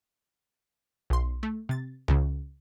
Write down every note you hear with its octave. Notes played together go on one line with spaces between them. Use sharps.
B1 C6
A3
C3 A6
C#2 C#3